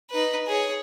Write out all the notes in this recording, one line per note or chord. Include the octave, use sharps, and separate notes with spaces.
D#4 B4
G#4 C#5